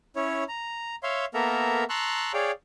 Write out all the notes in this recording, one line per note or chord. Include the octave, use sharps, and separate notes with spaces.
C#4 E4 C#5
A#5
C#5 E5 F5 C6
A#3 B3 A4 A#4 E5 A#5
A5 A#5 C6 C#6 E6 F#6
G#4 C#5 D5 F5 G5